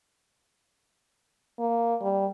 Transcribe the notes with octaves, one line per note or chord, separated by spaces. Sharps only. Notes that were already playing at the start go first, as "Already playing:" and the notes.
A#3
G3